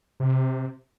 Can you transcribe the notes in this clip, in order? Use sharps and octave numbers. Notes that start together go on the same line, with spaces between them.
C3